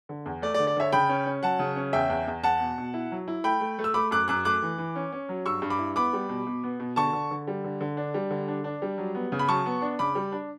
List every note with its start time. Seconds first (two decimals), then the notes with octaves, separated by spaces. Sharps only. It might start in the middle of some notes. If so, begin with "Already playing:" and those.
0.09 D3
0.26 E2
0.42 A3 D5
0.54 D5
0.59 D3
0.67 D5
0.77 D3 C#5 E5
0.92 C#3 G5 B5
1.09 C#4
1.26 C#4
1.43 F#3 F#5 A5
1.59 C#3
1.76 C#4
1.93 E2 E5 G5
2.10 E2
2.28 E2
2.43 E2 F#5 A5
2.60 B2
2.78 B2
2.94 E4
3.12 F#3
3.28 E4
3.44 A3 G5 B5
3.61 A3
3.79 A3
3.84 E6
3.94 A3 B5 D6
4.11 F#2 D6 F#6
4.28 F#2 D6 F#6
4.45 A3 D6 F#6
4.62 E3
4.78 E3
4.96 C#4
5.12 C#4
5.29 F#3
5.46 G2 C#6 E6
5.62 G2
5.70 B5 D6
5.79 E4
5.96 B3 B5 D6
6.13 G3
6.29 B2
6.47 B2
6.64 B3
6.80 B2
6.96 D3 A5 C#6
7.13 D3
7.31 D3
7.47 G3
7.64 D3
7.81 D3
7.97 D4
8.14 G3
8.30 D3
8.48 D4
8.64 D4
8.82 G3
8.98 F#3
9.15 B3
9.32 C#3
9.39 B5
9.48 F#3 A5 C#6
9.66 B3
9.82 D4
9.99 C#3 B5 D6
10.15 G3
10.32 D4